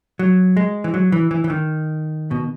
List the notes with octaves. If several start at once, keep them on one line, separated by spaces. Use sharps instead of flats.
F#3
G#3
E3
F#3
E3
E3
E3
D#3
B2